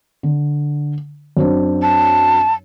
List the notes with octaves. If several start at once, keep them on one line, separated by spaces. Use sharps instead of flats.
D3
F#2 C4 D4
A5